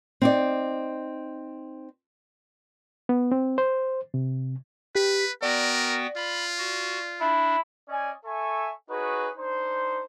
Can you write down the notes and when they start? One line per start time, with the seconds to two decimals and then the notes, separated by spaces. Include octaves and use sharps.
0.22 C4 D#4 D5
3.09 B3
3.32 C4
3.58 C5
4.14 C3
4.95 G4 B4 B6
5.42 B3 F#4 A#4 D5 G5
6.17 F4 B5
6.58 F#4
7.21 D4 E4
7.89 C#4 D5 D#5 G#5
8.25 A4 E5 G#5 C#6
8.89 D#4 F#4 G#4 B4 C#5
9.37 D4 D#4 C5